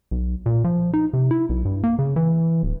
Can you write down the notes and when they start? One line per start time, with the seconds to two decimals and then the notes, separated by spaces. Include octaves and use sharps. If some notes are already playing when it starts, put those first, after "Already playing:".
0.11 B1
0.46 A#2
0.64 F3
0.94 D#4
1.13 C3
1.31 E4
1.49 B1
1.65 G2
1.84 A#3
1.99 C#3
2.16 E3
2.63 D1